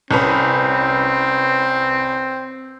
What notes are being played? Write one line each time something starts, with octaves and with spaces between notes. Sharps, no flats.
C2 C4 C#4 B4